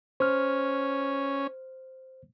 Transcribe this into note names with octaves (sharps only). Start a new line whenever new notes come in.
C#4 C5 F6